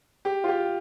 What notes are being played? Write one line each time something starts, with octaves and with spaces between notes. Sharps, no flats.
G4
F4
G4